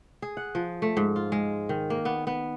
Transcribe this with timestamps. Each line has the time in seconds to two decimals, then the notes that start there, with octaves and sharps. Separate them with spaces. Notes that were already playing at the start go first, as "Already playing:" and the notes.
0.22 G#4
0.37 F#5
0.55 F3
0.82 A3
0.97 G#2
1.16 F4
1.32 G#3
1.69 D#3
1.90 A#3
2.05 B3
2.27 B3